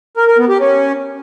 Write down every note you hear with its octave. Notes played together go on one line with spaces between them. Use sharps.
A#4
A#4
B3
G4
C#4